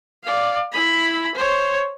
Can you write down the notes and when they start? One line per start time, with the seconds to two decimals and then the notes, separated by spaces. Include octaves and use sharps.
0.24 D5 F5
0.72 E4 B5
1.35 C5 C#5